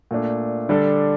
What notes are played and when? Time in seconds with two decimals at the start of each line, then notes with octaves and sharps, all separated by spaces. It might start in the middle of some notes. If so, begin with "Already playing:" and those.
0.11 A#2 A3 D4
0.69 D3 G3 D4 A4